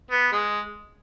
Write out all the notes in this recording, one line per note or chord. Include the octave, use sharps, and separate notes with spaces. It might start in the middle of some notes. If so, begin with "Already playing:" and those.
B3
G#3